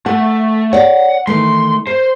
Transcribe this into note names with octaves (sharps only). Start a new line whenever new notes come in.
A3 F#5
C#5 D5 F#5
D#3 E3 A3 C6
A#4 C5